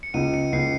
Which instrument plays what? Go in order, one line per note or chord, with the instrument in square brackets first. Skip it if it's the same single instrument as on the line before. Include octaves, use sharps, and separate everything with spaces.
[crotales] C#7
[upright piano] C#2 [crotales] D#7
[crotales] C#7
[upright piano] C#2 [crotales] C7